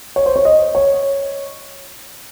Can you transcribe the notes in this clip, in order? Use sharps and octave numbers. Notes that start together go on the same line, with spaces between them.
C#5
C5
C#5
D#5
C#5